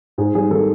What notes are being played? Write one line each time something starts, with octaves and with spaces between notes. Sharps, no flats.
G#2 G#4
G3 G#4
D#3 A4